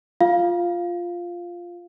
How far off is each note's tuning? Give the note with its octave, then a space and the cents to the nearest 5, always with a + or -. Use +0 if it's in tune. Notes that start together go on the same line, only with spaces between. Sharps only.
F4 +0 F5 +0